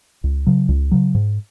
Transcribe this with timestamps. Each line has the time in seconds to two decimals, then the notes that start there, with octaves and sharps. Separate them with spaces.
0.24 C#2
0.47 C#3 F#3
0.69 C#2
0.91 C#3 F#3
1.15 G#2